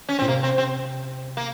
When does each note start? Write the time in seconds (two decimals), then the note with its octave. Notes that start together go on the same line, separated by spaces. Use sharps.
0.09 C#4
0.19 A#2 C4
0.28 C3 A#3
0.43 C4
0.58 C4
1.37 A#3